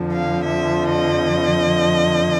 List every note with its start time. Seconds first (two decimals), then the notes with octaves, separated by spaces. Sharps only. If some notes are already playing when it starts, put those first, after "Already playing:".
Already playing: F2 D3 F3
0.13 F5
0.44 E5
0.91 D#5